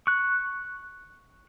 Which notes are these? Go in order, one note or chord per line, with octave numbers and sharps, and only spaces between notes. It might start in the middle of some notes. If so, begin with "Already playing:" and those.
C#6 F#6